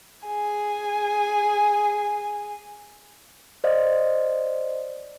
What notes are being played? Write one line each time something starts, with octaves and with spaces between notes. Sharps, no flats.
G#4 G#5
C5 D5 D#5 F5